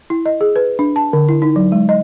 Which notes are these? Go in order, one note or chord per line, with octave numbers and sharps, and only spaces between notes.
E4
D#5
G#4
B4
D4
A5
D3
E4
D#4
F#3
G#3
D#5